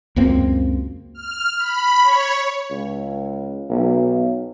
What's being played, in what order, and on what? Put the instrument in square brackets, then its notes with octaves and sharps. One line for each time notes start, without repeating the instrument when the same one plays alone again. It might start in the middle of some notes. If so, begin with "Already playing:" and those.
[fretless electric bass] C#2 F#2 A#3 C4
[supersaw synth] F6
B5
C#5
[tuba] C#2
B1